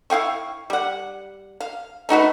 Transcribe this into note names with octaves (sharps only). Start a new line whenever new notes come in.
E4 F5 G5 C#6
G3 F#5
F5
A3 D#4 F#4 B4